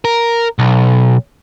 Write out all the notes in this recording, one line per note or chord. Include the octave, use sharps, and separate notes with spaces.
A#4
B1